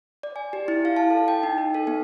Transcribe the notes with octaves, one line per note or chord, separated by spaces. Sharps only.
D5
G#5
G4
E4
F5
A5
A4
G5
D#4
D#4
A4
B3